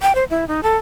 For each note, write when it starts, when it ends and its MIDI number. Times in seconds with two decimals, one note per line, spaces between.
0.02 0.15 79
0.15 0.24 72
0.30 0.47 64
0.48 0.61 63
0.63 0.76 69